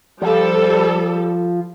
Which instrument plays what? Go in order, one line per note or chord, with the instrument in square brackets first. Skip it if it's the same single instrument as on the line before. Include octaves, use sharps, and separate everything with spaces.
[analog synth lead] F3 [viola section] G3 A4